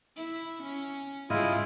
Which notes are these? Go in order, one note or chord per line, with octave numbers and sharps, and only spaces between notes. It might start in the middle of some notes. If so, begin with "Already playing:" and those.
E4
C#4
G#2 C#3 G3 G#3 E4 F4 D#5